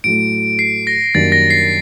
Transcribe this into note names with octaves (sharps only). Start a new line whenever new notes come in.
A2 F#3 A3 D7
C7
A#6
F#2 D#3 G3 A#3 D4 A6
A#6
C7